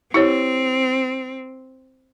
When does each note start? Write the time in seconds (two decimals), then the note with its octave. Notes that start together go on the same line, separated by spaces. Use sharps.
0.14 C4 E4 G4 C#5